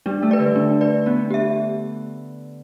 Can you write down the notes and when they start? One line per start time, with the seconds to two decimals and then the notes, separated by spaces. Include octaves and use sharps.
0.06 G3 D4
0.22 A3
0.31 B4 D5
0.39 D3
0.56 D4
0.81 B4 D5
1.06 B3 D4
1.30 G4 E5